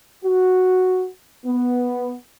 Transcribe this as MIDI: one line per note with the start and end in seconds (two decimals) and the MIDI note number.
0.24 1.05 66
1.45 2.13 59